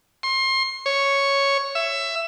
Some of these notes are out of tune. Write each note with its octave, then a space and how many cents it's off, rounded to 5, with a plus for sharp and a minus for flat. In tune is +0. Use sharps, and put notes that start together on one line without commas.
C6 +30
C#5 +0
E5 +15